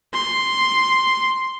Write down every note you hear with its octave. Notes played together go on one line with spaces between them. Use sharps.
C6